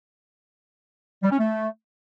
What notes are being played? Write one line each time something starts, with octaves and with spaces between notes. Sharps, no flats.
G3
C#4
A3